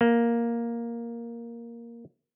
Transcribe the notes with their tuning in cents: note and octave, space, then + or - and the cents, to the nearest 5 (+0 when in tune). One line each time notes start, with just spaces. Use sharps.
A#3 +5